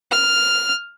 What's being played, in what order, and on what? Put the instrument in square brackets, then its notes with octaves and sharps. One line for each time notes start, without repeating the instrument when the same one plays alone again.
[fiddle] F6